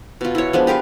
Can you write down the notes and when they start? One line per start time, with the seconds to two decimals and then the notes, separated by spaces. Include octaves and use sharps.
0.21 B2 F4
0.35 E4 C#5
0.53 F3 G#3 B3 D4
0.67 G4 A#4 B4 F5